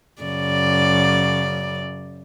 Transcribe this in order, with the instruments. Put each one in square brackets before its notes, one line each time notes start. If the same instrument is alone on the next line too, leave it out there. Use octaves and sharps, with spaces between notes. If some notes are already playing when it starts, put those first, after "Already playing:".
[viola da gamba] F#2 C#3 D5